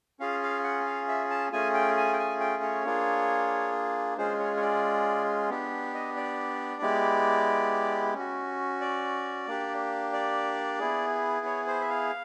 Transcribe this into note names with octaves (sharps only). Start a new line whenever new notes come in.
C#4 F4 G#4 F5
F5
F#5
F5
E5
A5
A3 C#4 F4 G#4 G#5
G5
G#5
G5
G#5
G5
C#5
A#3 D4 F4 G#4
G#3 C#4 F4 G#4 C5
C#5
C#5
D5
B3 D4 G4
D#5
D5
G#3 B3 E4 G4
C#4
F#4
D5
A#3 D4 G4
D5
B3 E4 G#4
C#5
C5
E5
F5